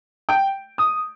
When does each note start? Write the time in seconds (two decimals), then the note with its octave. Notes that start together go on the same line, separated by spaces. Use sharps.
0.29 G5
0.78 D#6